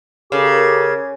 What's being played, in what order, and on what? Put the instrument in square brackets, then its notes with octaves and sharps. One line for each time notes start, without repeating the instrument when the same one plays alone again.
[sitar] C#3 [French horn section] G4 A4 A#4 [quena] D6